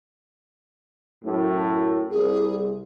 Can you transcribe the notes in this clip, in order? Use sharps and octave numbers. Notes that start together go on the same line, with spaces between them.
F#2 A2
C2 G#4